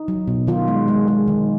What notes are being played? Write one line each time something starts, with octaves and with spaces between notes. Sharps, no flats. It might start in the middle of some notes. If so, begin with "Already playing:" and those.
Already playing: D#4
F#3
B2
D#3 F4
G#3
G#3
G#3
D#3